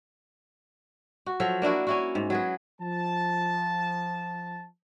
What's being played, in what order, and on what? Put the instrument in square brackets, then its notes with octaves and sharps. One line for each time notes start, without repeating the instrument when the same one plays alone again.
[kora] F#4
F3 F#3 A4 E5
A#3 D4 E4 F#4
C#4 E4 F#4
G#2
F#3 G#4 B4
[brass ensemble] F3 A5